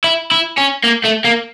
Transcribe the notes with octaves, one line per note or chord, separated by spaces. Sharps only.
E4
E4
C#4
A#3
A3
A#3